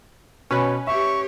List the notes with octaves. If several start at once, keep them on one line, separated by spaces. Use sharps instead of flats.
B2 C#4 B4 C#5
G4 C#5 E5 C#6